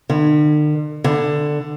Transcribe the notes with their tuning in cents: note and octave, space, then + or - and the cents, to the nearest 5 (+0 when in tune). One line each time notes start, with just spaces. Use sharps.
D3 +45
D3 +10